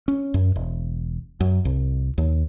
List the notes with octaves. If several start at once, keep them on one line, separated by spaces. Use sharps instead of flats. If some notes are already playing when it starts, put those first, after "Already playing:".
C#4
F#2
E1
F#2
C2
D#2